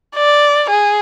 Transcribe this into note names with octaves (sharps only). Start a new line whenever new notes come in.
D5
G#4